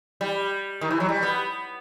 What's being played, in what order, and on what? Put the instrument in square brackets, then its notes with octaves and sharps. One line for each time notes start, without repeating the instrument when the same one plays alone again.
[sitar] G3
D#3
E3
F#3
G3
B3